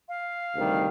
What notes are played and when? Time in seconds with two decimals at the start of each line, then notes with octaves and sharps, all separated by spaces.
0.09 F5
0.55 D2 C3 D#3 G3